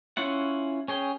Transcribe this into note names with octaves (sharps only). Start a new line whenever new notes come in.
C#4 E4 F4 F#5
C#4 G#4 G5